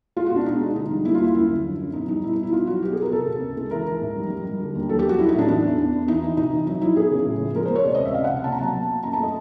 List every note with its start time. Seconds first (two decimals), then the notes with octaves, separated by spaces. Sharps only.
0.16 G#3 F4
0.26 F#4
0.31 B2 D4
0.46 B2 D#4
0.61 G#3
0.75 D3 D#4
0.91 G3
1.05 A#3 E4
1.14 F4
1.20 D#2 E4
1.34 F#2 E4
1.49 D3
1.64 F#3
1.79 F#2
1.94 B2 D#4
2.08 G3 D#4
2.24 B2 E4
2.33 D#4
2.38 B2
2.43 E4
2.52 B2 F4
2.67 F#3 F#4
2.83 B3 G4
2.92 G#4
2.97 B3
3.02 A#4
3.12 C3 A4
3.27 C3
3.42 C#2
3.57 G#3
3.71 E3 A#4
3.86 E3
4.01 G#2
4.15 G3
4.30 G3
4.45 G3
4.60 D3
4.75 D#2
4.89 F#3 A4
4.99 G4
5.05 F#3 F#4
5.19 F#3 E4
5.29 D#4
5.34 A2 D4
5.48 E3 D4
5.63 E2
5.78 E2
5.93 E2
6.08 E3 D#4
6.23 E3
6.37 C3 D#4
6.52 E3
6.67 F#3 D#4
6.81 F#3 E4
6.96 B3 G#4
7.11 C#3
7.26 A2
7.41 F3
7.56 G#3 A#4
7.65 C5
7.70 G#3
7.76 C#5
7.85 C3 D5
7.95 D#5
7.99 C#2
8.05 E5
8.14 C#2 F5
8.24 F#5
8.29 C3
8.44 A#3 A5
8.52 A#5
8.59 F#3 A5
8.74 B2
8.88 A#3
9.03 F#2 A#5
9.13 A5
9.19 A3 D#5